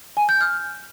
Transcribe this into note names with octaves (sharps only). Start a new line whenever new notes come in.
G#5
G6
F6